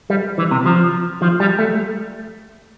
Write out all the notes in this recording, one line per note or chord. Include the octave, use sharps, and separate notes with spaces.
G3
E3
C3
F3
F3
G3
A3